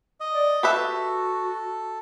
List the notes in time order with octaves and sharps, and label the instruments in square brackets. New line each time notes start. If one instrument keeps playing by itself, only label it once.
[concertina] D#5
[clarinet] D5
[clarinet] F#4 [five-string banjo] G4 B4 E5 [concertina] A4